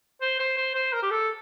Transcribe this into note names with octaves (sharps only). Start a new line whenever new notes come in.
C5
C5
C5
C5
A#4
G4
A4